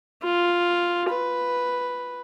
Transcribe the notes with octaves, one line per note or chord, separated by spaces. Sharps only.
F4
B4